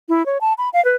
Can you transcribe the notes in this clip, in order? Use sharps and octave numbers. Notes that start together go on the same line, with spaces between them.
E4
C#5
A5
B5
F5
B4